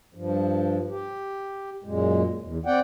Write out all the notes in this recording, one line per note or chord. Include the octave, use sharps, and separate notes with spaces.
G2 F3
G4
F#2 A#2 G#3
E2
C4 D5 F#5 G5